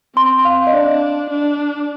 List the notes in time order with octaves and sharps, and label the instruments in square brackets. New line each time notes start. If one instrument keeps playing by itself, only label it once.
[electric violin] C4 [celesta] C6
[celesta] F5
D#5
[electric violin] D4 [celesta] D5
[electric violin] D4